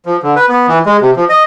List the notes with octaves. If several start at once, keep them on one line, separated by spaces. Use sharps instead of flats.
F3
D3
B4
B3
E3
G#3
C3
F3
D#5